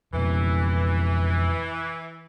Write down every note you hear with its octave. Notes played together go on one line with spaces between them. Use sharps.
F2 B2 E3